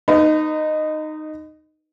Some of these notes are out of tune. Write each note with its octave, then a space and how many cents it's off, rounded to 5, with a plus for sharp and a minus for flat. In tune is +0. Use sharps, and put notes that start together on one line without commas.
D#4 -10 B4 +40